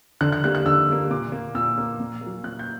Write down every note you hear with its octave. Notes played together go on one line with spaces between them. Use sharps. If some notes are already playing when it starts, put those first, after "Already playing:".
D3 F#6
F#6
G3 A#3 F#6
F#6
D3 E6
G3 A#3
A#2 D6
A#3
A#2 E6
A#3
A#2
A#3
F#3
A#2 F#6
G6